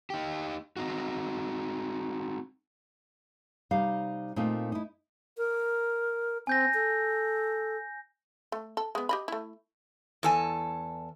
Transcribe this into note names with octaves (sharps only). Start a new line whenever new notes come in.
D#4 G4
C4 D#4 F#4
C3 G3 D#4 F5
A#2 A3 C4 D#4 F4
D#4 E4
A#4
C4 G#5 G6 A#6
A4
A3
A4
G#3 B3
G4 D#5 B5
A3 E4
E2 A4 G#5